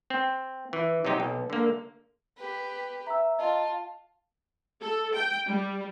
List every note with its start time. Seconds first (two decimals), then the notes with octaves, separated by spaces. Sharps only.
0.10 C4
0.73 E3
1.05 C3 F#3 D#4 G4
1.20 B1
1.50 D3 A#3
2.37 G4 B4
3.07 E5 A#5 E6
3.39 F4 D#5 A5
4.81 A4
5.14 G5
5.47 G3